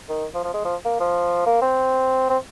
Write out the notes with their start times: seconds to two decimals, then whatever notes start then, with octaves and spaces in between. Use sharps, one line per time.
0.09 D#3
0.34 F3
0.45 F3
0.54 G#3
0.65 F3
0.85 A#3
1.00 F3
1.46 A#3
1.62 C4
2.29 C4